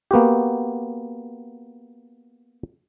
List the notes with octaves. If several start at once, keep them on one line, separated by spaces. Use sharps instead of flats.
A#3 B3 F#4 G4